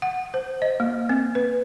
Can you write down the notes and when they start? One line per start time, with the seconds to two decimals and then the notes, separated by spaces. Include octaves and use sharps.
0.02 F#5
0.34 C5
0.62 D#5
0.80 A#3
1.09 C4
1.35 B4